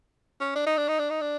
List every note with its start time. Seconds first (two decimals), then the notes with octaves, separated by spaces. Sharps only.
0.40 C#4
0.55 D4
0.66 D#4
0.77 D4
0.88 D#4
0.99 D4
1.10 D#4
1.21 D4